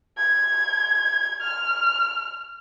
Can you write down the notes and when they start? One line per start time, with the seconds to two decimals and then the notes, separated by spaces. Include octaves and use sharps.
0.17 G#6
1.42 F6